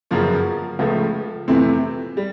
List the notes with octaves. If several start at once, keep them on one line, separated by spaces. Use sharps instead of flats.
G1 F#2 C#3 F3 A#3
C#2 C#3 F3 A3
F2 C3 E3 A3 C4
G3